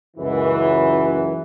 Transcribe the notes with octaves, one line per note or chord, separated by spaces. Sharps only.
C#2 F#2 E3